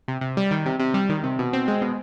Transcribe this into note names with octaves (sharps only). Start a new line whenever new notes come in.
C3
C3
G3
D#3
C3
C3
G3
D#3
C3
B2
C4
G#3
B2